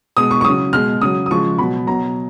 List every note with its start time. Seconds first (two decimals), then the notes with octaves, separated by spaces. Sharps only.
0.17 B2 G#3 D#6
0.31 C#6
0.41 C#6
0.44 C#3 F#3 D#6
0.73 B2 G#3 F6
1.01 C#3 F#3 D#6
1.26 D#6
1.31 C#3 F3 G#3 C#6
1.58 B2 F#3 B5
1.87 B2 F#3 A#5